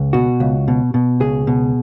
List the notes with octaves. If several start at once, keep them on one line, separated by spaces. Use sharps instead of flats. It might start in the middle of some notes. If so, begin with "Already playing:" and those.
Already playing: C#2
B2 F#4
C#2
B2
B2
C#2 G#4
B2